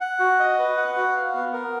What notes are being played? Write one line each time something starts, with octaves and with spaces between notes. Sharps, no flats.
F#5
F#4
D#5
B4
F#5
F#4
F5
B3
A#4